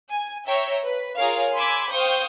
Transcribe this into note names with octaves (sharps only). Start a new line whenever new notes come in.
G#5
C#5 E5 G5 A#5
B4
F4 G#4 A#4 C#5 F5
G#5 B5 C6 D6 E6 G#6
C5 F5 G5 C#6 D#6 G6